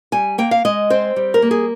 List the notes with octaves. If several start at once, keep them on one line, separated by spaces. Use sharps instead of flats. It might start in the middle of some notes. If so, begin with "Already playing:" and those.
G3 G#5
A#3 G5
F5
G#3 D#5
C4 C5
G3
A#4
A#3
G#4